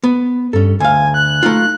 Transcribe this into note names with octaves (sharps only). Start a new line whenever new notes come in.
B3
G2 C#4 A4
D2 F5 G#5
F#6
A3 D#4 F4